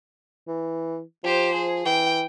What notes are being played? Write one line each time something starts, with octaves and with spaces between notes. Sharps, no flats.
E3
F3 G4 C5
G#4
E3 G5